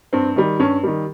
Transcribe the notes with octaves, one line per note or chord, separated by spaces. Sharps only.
G2 C4
D#3 G3
G2 C#4
D#3 G3